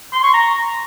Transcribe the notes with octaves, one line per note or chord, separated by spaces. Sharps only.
C6
C#6
A#5